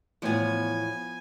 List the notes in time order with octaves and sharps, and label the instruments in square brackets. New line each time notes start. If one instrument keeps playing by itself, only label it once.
[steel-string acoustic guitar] E2 A2 C#5 [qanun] F3 B3 [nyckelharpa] G#5